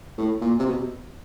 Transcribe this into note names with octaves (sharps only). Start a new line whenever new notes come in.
A2
A#2
C3
B2